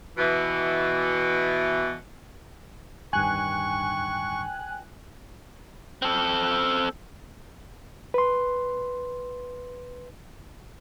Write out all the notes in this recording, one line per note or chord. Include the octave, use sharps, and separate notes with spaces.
B2 E3
D1 G2 D#3 G5 G#5 C#6 F#6
C4 A4
B4 C6